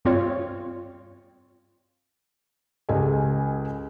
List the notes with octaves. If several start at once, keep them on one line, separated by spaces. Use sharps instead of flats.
G2 C4 F4 C#5
C#2 G#3 G4 A4 D#5 G#5